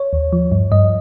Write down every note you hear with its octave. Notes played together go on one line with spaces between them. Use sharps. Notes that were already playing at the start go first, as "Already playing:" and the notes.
Already playing: C#5
D#2
F3
G2
G2 D#5